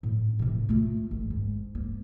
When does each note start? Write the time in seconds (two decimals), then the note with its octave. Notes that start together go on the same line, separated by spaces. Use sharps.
0.03 A2
0.39 A2 C3
0.69 A3 F4
1.11 G#1
1.30 G#2
1.75 A#3